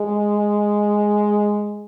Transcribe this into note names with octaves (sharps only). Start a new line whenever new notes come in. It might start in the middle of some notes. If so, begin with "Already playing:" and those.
Already playing: G#3